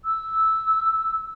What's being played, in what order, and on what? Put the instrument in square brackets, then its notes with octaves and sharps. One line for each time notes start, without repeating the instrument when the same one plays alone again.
[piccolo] E6